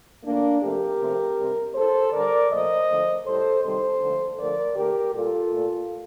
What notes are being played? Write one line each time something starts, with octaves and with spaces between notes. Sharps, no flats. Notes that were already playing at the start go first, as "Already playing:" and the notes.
A#2 A3 A#3 D4
C3 F3 A3 G4 A#4
C3 F3 A3
C3 G3
A2 A3 A4 C5
D3 G3 A#4 D5
A#2 F3 A3 C5 D#5
D3 F3 A3
A2 G3 A4 C5
C3 D#3 G3 A4 C5
D3 F3 A3
D3 F3 A3 A#4 D5
D3 A3 G4 A#4
A#2 G3 F4 A4
A#2 A3